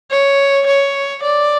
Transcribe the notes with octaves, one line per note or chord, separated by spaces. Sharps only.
C#5
C#5
D5